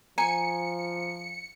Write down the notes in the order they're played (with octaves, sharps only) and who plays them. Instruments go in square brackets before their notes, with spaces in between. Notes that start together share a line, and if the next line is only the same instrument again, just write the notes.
[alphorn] F3 [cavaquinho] G#5 [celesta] A#5 [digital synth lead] C#7